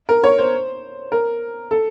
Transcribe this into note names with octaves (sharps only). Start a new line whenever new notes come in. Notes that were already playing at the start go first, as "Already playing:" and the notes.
A#4
C#5
C5
A#4
A4